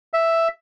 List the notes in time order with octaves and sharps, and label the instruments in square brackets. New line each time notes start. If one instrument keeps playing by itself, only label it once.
[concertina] E5